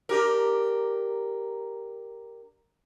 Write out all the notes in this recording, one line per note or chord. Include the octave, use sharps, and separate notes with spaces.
D4 G4 A#4